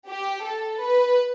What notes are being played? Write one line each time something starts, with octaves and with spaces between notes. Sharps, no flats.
G4
A4
B4